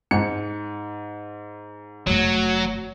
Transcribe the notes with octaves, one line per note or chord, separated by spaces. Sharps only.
G#2 C#7
F1 F#3 A3